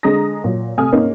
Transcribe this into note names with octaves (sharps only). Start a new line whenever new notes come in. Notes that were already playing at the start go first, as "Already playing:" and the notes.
D3 G#3 G#4 A#5 D#6 A#6
A#2 F#3
C3 A3 G#5 D#6 F6
G#2 A#3 C#4 D#4